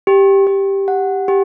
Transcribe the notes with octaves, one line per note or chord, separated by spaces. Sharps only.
G4
G4
F#5
G4